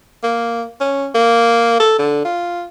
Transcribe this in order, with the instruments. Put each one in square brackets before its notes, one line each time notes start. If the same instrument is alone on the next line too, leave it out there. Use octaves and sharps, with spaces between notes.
[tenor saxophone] A#3
C#4
A#3
A4
D3
F4